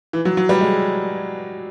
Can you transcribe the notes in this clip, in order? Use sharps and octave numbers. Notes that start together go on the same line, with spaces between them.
E3
F#3
F#3
G3
G#3